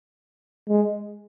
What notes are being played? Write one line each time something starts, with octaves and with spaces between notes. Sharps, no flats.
G#3